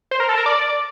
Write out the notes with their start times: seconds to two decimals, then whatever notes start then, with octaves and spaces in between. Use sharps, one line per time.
0.11 C5
0.20 A#4
0.29 A4
0.38 A#4
0.46 D5